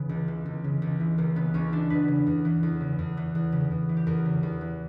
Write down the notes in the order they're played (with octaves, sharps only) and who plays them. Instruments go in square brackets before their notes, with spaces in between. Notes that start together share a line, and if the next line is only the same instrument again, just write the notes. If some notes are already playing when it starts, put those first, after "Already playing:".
Already playing: [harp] C#3 E3 B3
C#2
E3
C#2
C#3
C#2
E3
C#2 A#3
C#3 B3
C#2 C#4
E3 D4
E2 B4
C#3
E2
E3
E2
C#3
E2
E3
E2
C#3
E2
E3
G4
E2 A#4
C#3
E2
E3